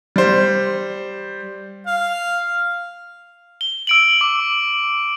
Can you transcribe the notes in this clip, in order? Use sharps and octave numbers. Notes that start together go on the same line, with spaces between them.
G3 C5
F5
G7
E6 D7 F#7
D6